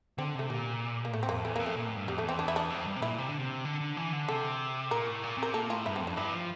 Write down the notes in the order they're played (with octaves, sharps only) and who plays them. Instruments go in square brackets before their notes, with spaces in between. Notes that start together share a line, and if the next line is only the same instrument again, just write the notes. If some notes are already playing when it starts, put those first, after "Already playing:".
[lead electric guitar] D3 [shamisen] C4
[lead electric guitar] C3 [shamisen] A3
[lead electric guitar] A#2 [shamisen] G3
[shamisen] A#3
[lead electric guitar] A2 [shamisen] A3
[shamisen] C4
[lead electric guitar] F2 [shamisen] A#3
[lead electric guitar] E2 [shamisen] A3
[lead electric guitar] F2 [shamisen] A#3
[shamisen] A3
[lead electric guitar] A#2
A2
G2
[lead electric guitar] F2 [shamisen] G3
[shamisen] A3
[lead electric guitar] E2
[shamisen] C4
D4
E4
D4
[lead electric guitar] F2
G2
C3
[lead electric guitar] A#2 [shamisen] E4
[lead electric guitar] C3
D3
C3
D3
D3
E3
D3
[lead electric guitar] C3 [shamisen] A4
[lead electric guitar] A#2 [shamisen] A#4
[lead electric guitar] A2
A#2
[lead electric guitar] C3 [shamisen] A#4
[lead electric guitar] A#2 [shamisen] A4
[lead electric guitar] A2 [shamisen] F4
[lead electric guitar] G2 [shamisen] E4
[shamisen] C4
[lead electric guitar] F2
[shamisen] D4
[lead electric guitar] G2 [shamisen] E4
[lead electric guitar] F3